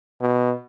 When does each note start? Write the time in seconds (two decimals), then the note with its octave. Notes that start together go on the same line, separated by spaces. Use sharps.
0.20 B2